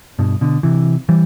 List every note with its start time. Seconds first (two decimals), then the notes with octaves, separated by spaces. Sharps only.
0.19 G2 B2
0.41 B2 D3
0.63 C3 E3
1.09 E3 G3